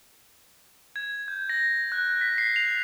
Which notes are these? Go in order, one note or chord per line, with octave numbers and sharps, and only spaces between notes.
G#6
G6
A#6
F#6
B6
C7
F7